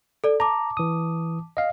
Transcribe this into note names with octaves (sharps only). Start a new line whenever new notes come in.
A4 D5
A5 A#5 D6
E3 D#6
D#5 F5